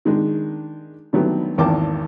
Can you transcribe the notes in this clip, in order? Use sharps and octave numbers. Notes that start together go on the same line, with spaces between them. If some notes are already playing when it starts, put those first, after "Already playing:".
D#3 G#3 D4
D3 D#3 F#3 G3 A3 B3
G#1 E2 A#3 G5 A5 D6